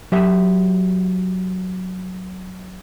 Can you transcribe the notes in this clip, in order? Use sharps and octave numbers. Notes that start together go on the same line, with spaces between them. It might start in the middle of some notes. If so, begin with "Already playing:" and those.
F#3 G4 E5